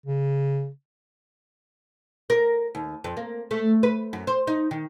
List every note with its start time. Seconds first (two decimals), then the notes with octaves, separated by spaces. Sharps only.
0.06 C#3
2.30 A#4
2.75 D#2
3.04 F2
3.17 A#3
3.51 A3
3.83 B4
4.13 F#2
4.27 C5
4.47 D#4
4.71 D#3